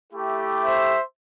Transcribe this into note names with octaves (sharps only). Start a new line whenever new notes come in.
A3 E4 G4
C5 E5